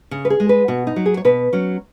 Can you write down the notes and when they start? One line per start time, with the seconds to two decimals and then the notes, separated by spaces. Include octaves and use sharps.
0.11 C#3
0.25 B4
0.30 G#4
0.40 G#3
0.49 B4
0.68 B2 F#4
0.87 D#4
0.96 F#3
1.06 G#4
1.17 C#5
1.25 B2 B4
1.53 F#3 C#4